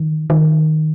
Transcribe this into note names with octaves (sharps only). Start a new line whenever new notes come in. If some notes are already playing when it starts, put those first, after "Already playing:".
Already playing: D#3
D#3